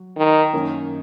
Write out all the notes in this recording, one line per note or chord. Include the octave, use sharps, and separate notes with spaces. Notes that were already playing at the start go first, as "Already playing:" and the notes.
Already playing: F#3
D#3
F#2 D#3 A#3 C#4